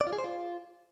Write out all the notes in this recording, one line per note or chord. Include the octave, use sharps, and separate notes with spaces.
D5
F4
G#4
C5
F4